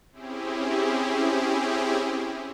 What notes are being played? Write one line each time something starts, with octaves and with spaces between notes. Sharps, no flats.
C4 C#4 E4 G4 G#4